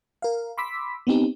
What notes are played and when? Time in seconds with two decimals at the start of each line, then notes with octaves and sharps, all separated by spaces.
0.22 A#4 F5
0.57 B5 C6 D6 E6 B6
1.07 B3 C4 D#4 G4